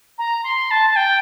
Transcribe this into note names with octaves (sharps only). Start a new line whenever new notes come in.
A#5
C6
A5
A5
G5